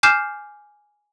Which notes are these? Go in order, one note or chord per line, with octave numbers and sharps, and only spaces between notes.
G#5 D6 F6 G6 C7 E7